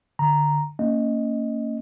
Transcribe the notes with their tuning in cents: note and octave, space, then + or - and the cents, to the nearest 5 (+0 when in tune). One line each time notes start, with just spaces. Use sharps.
D3 +15 A#5 +0
A#3 -30 C#4 +0 D#5 +0